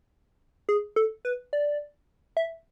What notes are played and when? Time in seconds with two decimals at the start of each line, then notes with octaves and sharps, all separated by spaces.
0.69 G#4
0.96 A4
1.25 B4
1.53 D5
2.37 E5